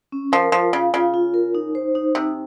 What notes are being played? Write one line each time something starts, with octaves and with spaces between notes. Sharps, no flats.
C#4
F3 A#4
F3 F4
C#3 F5
C#3 F4
F4
A#4
D#4
C5
D#4
C3 D#4